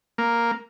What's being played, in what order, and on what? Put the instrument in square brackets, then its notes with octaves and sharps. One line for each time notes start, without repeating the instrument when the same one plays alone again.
[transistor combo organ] A#3